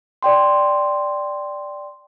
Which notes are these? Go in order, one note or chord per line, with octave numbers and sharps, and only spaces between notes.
D5 G5 C6